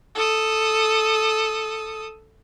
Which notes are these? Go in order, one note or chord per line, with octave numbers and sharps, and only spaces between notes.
A4 D#6